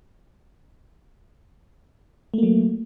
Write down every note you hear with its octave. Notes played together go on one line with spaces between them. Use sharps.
F#3 A3 A#3